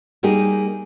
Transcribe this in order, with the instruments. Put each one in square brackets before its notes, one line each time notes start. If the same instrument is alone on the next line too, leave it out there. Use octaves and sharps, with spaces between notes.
[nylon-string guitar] G3 A#3 D#4 G4 G#4